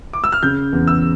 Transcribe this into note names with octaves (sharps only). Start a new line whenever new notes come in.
D6
E6
F6
C#3 G6
E2
E6